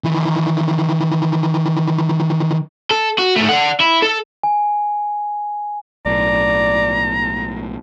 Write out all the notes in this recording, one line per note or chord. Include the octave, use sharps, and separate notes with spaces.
D#3 E3
A4
F#4
G#2 A3
D5 F#5
E4
A4
G#5
B1 A2 D5 A#5